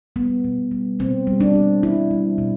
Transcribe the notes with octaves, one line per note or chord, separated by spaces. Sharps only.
G3 B3
B2
G3
B2 C4
G3
D4
G3
G3 E4
G3
B2